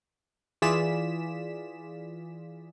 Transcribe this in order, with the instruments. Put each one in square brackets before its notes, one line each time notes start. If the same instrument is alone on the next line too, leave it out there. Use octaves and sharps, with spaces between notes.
[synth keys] E3 F4 G#4 D5 B6 E7